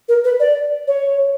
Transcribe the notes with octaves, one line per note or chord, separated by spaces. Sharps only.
A#4
B4
D5
C#5